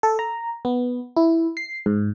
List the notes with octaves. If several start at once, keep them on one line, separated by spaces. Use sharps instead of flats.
A4
A#5
B3
E4
C7
G#2